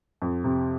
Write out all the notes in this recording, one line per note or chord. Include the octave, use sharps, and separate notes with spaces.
F2
C3